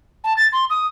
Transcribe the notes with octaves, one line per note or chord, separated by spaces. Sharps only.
A5
A6
C6
D#6